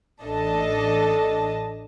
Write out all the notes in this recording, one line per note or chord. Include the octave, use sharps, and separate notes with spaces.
A1 D4 A4 D#5 A5